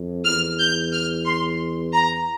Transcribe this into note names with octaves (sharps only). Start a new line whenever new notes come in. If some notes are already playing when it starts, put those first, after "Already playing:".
Already playing: F2
E2 F6
G6
F6
C6
A#5